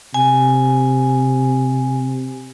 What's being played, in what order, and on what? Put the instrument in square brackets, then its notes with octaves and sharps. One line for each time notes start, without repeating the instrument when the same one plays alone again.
[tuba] C3 [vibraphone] G#5